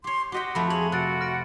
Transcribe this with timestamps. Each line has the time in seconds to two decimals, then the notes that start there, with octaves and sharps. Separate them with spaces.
0.04 G4 C#5 C6
0.32 F#4 G4 D#5 G5 C6 B6
0.55 F2 A3 C#5 B5
0.70 G#4 C#5 F#7
0.92 C3 F#4 F#6 A6 D7
1.21 F6 A#6 D7